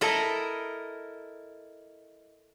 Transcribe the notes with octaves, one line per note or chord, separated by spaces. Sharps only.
E4 A4 A#4 D#5